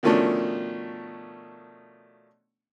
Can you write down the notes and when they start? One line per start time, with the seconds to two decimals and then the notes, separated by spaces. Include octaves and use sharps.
0.03 B2 D#3 F3 A3 C#4 D4